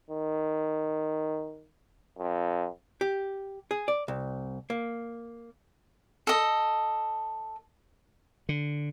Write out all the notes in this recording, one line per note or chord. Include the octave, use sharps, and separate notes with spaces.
D#3
F2
G4
G#4
D5
C2
A#3
A4 D#5
D3